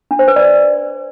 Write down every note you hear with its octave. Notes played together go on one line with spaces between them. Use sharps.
D4
C5
B4
D5